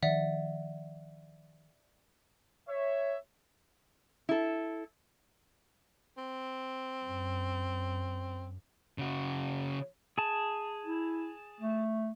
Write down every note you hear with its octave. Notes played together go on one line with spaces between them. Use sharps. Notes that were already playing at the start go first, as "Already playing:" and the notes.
D#3 F3 D5 E5 F#5
C#5 E5
E4 A4
C4
F#2
C#3 F#4
G#4 A5
E4
A3